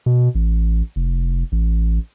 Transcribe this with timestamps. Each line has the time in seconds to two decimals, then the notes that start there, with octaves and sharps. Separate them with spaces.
0.06 B2
0.35 A1
0.96 F1
1.52 A1